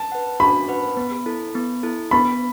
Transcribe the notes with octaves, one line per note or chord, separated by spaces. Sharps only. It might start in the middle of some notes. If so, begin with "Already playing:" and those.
Already playing: A5
B4 F#5
F#4 B5
B4 F#5
B3
E4 A4
B3
E4 A4
B3 B5